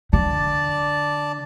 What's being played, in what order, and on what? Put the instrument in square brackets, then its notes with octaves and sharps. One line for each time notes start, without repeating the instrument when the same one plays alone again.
[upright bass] D3 [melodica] D5 A5